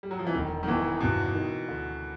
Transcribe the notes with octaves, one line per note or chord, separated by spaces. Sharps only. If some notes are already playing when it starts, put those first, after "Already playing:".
G3
F#3
F3
E3
E1 D#3
D#3
E2 E3
G1 B2
D#3
D2